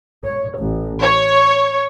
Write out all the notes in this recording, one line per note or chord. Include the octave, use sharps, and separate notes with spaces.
C#5
A1
C#5